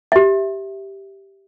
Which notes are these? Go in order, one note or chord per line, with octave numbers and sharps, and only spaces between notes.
G4 E5